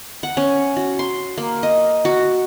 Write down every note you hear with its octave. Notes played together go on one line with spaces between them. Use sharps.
F#5
C#4
F#4
C6
A#3
D#5
F#4